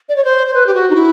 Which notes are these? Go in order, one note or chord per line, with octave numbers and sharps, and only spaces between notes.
D5
C#5
C5
C5
B4
G4
F#4
D#4
E4